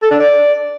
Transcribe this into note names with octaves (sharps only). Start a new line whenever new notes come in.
A4
D4
D5